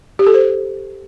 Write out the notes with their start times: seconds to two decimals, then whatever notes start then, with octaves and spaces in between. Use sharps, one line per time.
0.19 G4
0.27 A4
0.34 C5